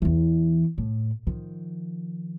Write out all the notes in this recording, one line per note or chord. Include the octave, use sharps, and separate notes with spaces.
E2 E3
A2
D#3 F3